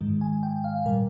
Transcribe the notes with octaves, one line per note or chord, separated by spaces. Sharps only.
G#2 D#3 G#3
G#5
G5
F5
A#2 G3 A#4